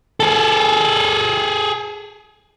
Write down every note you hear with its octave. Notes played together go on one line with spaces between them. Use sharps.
G#4 A4